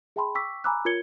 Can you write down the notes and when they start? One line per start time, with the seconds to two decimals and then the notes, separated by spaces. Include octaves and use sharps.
0.16 G#4 E5 G5 A5 B5 C6
0.35 G5 C#6 D6 E6 B6
0.64 G#5 A#5 B5 D6 E6 F#6
0.85 F4 A#4 C#5 G#6 C#7 G7